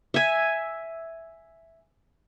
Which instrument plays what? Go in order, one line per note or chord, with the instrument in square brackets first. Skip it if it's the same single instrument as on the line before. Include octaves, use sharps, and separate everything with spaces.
[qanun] E5 G#5